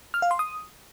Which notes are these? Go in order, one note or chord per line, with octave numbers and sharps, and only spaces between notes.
F6
F5
C6
D#6